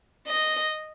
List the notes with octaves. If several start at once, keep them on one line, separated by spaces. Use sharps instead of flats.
D#5